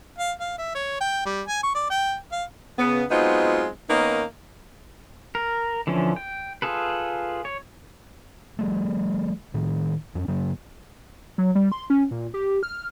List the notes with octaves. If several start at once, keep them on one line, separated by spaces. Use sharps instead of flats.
F5
F5
E5
C#5
G5
G3
G#5
C#6
D5
G5
F5
C#3 B3
F#3 G#3 B3 C4 D#4 F4
D#3 A#3 B3 C#4 D#4
A#4
D3 E3 F3 C#4
G5
F4 G#4 A4 B4
C#5
F3 G3 A3
A2 D#3
F2 C#4
F#2 C#3 F#3 A#3
F#3
G3
C6
C#4
A#2
G4
F6